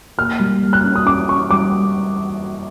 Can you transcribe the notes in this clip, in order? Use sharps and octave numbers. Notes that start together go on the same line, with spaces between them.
A#3 F6
G3
A#3
F#6
C#4
D#6
C#4 D6
C#4 C#6
G3 D6